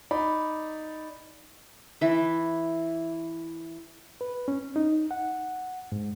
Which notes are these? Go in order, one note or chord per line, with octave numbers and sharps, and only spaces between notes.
D#4 D5 B5
E3 E5
B4
C#4
D#4
F#5
G#2